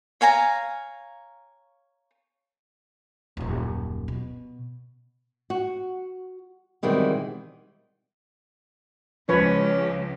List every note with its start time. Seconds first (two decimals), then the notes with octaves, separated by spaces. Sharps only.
0.21 C#5 F5 G#5 A#5
3.37 D#1 F#2
4.08 B2
5.50 F#4
6.83 B2 D#3 E3 G3 G#3 C4
9.29 C#2 F3 C#4 B4 C#5